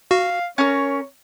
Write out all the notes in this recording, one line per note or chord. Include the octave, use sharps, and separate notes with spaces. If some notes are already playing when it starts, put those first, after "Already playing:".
F#4 F5
C#4 A#4 C#5